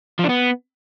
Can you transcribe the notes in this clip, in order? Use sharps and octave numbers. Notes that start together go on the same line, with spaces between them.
F3
D4
B3